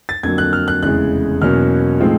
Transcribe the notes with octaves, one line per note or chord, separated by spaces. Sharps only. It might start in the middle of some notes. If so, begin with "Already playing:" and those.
A6
F2 D3 F#3 A#3 G#6
F#6
F6
F#6
F1 E2 C#3 E3 G#3 F#6
E2 B2 F#3 A#3 C#4 F6
A2 F3 G#3 C4 D#4